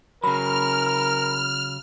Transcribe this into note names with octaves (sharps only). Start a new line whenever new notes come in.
C#3 F#3 A#4 B5 F6